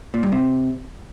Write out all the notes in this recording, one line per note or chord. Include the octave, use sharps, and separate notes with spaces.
A#2
G2
C3